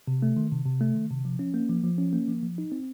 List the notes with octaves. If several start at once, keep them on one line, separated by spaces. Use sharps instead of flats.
C3
A3
D#3
C3
C3
A3
D#3
C3
F3
C#4
A#3
F3
F3
C#4
A#3
F3
F3
D#4
C4